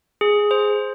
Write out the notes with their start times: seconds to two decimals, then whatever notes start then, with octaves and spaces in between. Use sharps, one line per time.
0.21 G#4
0.51 C5